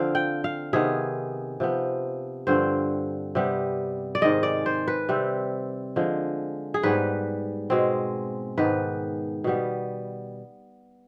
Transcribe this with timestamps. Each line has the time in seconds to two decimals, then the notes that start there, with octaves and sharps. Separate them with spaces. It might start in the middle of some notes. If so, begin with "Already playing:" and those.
Already playing: D3 F3 C4 F5
0.15 G5
0.44 F5
0.73 C3 D#3 B3 G#4
1.60 C3 F3 B3
2.47 G2 D3 F3 C4 C5
3.35 C3 G3 B3
4.15 D5
4.21 G#2 D#3 G#3 D#5
4.43 D5
4.66 C5
4.88 B4
5.09 C3 G3 C4
5.96 D3 F3 G#3
6.74 G#4
6.83 G#2 G3 B3 B4
7.70 B2 G#3 C4
8.58 G#2 D#3 B3 B4
9.44 B2 G3 B3